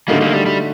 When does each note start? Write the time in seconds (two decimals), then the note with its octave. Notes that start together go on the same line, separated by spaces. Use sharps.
0.08 D3 G3 A3 A#3 D#4 F#4
0.21 G3 A#3
0.33 G3
0.46 G3